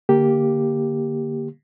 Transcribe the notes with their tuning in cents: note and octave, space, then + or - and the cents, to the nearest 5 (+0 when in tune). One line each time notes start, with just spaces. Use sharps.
D3 +0 A#3 +0 G4 +0